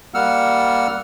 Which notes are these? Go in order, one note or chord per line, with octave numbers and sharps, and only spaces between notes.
G3 A#3 F#5 E6 F6